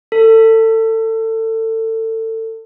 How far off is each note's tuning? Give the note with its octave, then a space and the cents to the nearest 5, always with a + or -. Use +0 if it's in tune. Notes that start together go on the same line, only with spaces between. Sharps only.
A4 +25